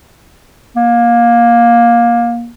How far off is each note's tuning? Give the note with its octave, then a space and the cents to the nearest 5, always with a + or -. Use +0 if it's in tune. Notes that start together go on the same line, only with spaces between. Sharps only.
A#3 +15